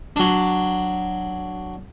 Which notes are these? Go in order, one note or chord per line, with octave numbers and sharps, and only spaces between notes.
F#3 D4